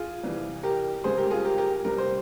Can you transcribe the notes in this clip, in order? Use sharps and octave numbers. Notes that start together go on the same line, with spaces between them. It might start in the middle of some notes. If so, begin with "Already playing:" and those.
Already playing: F4 G#4
C2 C3 E3 G3
G4 A#4
C#2 C#3 G3 C4 G#4 C5
G4 A#4
F4 G#4
G4 A#4
G4 A#4
C2 C3 G3 A#4
C5